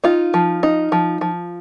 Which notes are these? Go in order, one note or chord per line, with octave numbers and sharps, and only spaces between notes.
D#4 F4
F3
D#4
F3
F3